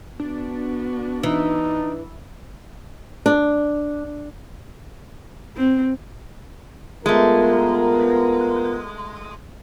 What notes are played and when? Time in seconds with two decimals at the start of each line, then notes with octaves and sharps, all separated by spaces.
0.20 B3 D4 F#4
1.23 E3 D#4
3.26 D4
5.57 C4
7.06 G#3 A3 B3 F4 A#4